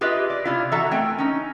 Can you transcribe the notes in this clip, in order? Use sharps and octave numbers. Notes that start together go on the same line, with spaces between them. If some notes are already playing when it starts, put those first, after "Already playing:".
F4 G4 G#4 B4 D#5 E5
D5
C3 E4 F4
E3 F#4 A4 E5 A#5
A3 C4 A#4 G5 G#5
C#4 D#4